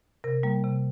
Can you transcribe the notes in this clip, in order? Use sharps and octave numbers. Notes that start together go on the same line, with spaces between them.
C3 A#4
G3 A#3
C3